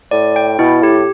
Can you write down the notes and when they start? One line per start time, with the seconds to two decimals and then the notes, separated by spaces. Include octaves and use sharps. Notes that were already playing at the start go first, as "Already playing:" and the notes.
0.11 A2 D5
0.36 G5
0.59 B2 E4
0.83 A2 G4